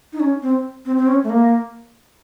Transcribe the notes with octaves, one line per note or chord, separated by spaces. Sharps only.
D#4
C#4
C4
C4
C4
C#4
A3
A#3